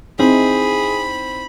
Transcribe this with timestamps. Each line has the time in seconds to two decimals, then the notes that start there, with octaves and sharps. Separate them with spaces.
0.19 C4 D#4 E4 G#4 B5